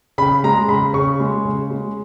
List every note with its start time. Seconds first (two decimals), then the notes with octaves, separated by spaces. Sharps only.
0.18 C#3 B5
0.44 G#3 A#5
0.68 C#3 B5
0.93 C#3 C#6
1.20 G#3
1.45 C#3
1.70 G#3